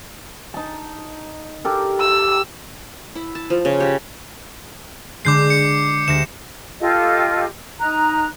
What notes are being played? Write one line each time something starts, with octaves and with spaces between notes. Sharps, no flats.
D#4 A5
G4 A4 A#4
E6
E4
A5
F3
C#3
G4
D3 G#3 D6 G6 C7
C#7
D2 G4 A#6 E7
F4 G4 A4 D#5
D#4 A#5 F#6